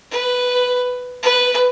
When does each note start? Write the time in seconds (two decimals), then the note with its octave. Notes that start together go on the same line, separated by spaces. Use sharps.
0.11 B4
1.23 B4